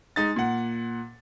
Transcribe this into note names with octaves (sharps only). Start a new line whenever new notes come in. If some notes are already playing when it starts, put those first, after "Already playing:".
G#3 D#4 A6
A#2 F#5